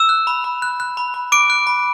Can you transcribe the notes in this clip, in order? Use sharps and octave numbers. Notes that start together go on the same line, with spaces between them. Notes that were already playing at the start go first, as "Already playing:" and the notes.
Already playing: E6 E7
F#6
B5
B5
F#6
F#6
B5
B5
D6 F#6 D7
F#6
B5